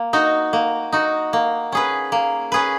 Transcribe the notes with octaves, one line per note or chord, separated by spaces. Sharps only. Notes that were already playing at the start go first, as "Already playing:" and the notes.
Already playing: A#3
D#4 F#4
A#3
D#4 F#4
A#3
C#4 G#4 B4
A#3
C#4 G#4 B4